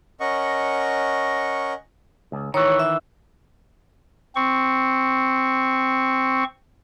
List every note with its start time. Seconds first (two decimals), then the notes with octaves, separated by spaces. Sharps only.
0.20 C#4 A#4 D#5 F#5 C#6
2.32 C#2
2.54 D#3 E3 C#5 C#6
2.79 E5
4.35 C4 C#6